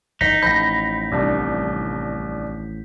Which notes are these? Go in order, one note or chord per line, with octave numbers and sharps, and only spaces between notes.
F#1 E3 D#4 B6
A1 F3 B5 G6 A#6
C2 D4